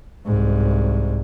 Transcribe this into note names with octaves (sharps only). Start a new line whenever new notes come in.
C2 G#2